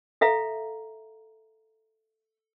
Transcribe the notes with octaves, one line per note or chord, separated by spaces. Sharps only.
A4 E5 F5 A#5